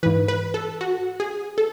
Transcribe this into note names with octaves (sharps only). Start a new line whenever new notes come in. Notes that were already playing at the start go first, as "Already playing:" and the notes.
G#2 E3 B4
B4
A4
F#4
G#4
A4